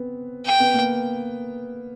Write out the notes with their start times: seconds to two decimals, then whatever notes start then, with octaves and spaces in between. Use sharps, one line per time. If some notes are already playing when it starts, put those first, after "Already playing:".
Already playing: B3 C4
0.46 G5
0.60 B3
0.74 A#3